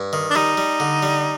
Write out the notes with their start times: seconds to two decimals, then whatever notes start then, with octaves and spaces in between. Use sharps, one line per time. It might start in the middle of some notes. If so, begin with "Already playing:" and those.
Already playing: G2
0.13 D#3
0.30 D4
0.35 G3 D#4
0.58 G3
0.80 D3
1.03 G3